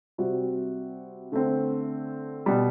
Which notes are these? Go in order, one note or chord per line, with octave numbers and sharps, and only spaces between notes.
C3 G3 C4 F#4
D3 A3 C4
B2 G3